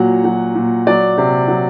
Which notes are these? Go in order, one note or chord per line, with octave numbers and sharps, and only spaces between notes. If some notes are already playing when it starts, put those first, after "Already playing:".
Already playing: A#2 F#3 F#5
F#3
A#2
F#3 D5
C3
F#3